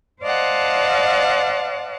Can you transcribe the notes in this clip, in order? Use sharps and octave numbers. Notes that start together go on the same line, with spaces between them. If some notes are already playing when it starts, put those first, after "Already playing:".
C5 D5 D#5 F5 F#5 A5